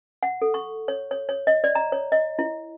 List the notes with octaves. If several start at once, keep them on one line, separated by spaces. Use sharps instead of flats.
F#5
A4
C#6
C#5
C#5
C#5
D#5
D5
A#5
C#5
D#5
E4